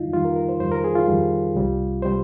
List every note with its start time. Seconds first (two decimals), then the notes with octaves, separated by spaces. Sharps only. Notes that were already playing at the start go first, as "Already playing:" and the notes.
Already playing: F2 D#3 G3 D#4 F4
0.13 F2 D#3 G3 F4
0.25 A#4
0.36 A#4
0.49 C5
0.60 F2 D#3 G3 C5
0.72 A#4
0.84 G#4
0.95 F4
1.08 F2 D#3 G3
1.55 C2 C3 G3
2.02 C3 G3 C5